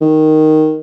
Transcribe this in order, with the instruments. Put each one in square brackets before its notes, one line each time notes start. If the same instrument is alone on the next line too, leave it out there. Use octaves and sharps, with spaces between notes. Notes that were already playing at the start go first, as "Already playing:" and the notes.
[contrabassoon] D#3